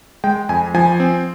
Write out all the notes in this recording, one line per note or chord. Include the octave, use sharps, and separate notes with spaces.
G#3 G5
F2 G#5
F3 G#5
C4